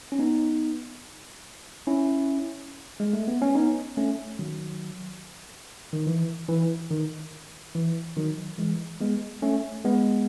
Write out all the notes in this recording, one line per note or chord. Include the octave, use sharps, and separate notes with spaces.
C#4
B3 D#4
C#4 E4
G#3
A3
B3
C#4
B3 D#4
A3 C#4
D#3 F#3
D#3
E3
E3
D#3
E3
D#3 F#3
E3 G#3
G#3 B3
A3 C#4
G#3 B3